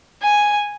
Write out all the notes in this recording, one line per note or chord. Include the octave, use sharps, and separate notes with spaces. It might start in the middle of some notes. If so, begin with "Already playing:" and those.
G#5